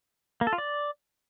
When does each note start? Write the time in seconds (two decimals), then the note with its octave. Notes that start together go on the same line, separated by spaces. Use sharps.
0.41 A#3
0.47 A4
0.53 F4
0.58 D5